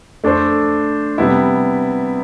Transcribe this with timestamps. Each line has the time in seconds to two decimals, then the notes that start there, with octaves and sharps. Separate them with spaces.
0.24 A3 D4 A4 C5
1.18 C3 G3 B3 E4